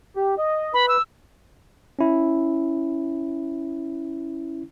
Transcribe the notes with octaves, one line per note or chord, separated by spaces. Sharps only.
G4
D#5
B4 B5
E6
C#4 E4